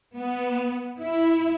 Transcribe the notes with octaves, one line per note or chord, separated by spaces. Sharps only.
B3
E4